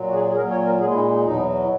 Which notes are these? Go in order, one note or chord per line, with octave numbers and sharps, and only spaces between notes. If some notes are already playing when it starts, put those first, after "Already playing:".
Already playing: A#2 F#3
F#4
G#4
G#4
A#2 F#3 A#4
C#5
A#4
A#2 G#3 G#4
E4
D#4
D#4
E2 B2 F#3 D#4